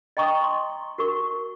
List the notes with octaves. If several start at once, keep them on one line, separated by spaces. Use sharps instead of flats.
D#5 G5 A#5 C#6 D#6
C6
F#4 A#4 C#6